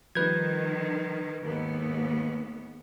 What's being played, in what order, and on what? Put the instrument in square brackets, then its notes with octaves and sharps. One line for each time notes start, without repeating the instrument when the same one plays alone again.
[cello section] D#3 [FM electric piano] F3 G3 [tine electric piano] B4 G6 G#6
[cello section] D#2 G#2 B3 [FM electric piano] D#3 A#4